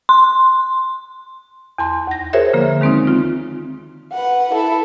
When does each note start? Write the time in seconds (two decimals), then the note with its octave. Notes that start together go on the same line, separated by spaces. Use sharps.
0.09 C6
1.78 E2 A5 C6
2.07 D#2 A#6
2.33 F#4 G#4 A#4 C5 C#5 E5
2.53 D3 F3 A#3
2.81 D#3 G#3 C4 C#4 D#4
3.07 C4 F4
4.13 B4 F#5
4.52 E4 A4